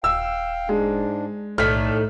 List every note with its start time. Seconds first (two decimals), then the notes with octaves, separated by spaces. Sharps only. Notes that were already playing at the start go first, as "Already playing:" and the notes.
0.04 D#1 F5 G5 E6
0.69 G#2 G#3 D4
1.58 B1 A2 D#3 A4 D5 F6 B6